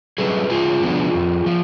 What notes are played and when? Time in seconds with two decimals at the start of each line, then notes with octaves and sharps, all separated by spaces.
0.18 F#3 A3 C#4 G#4 B4
0.50 G#2 F4 G#4
0.82 F3 B3 D4
1.14 F2
1.46 F3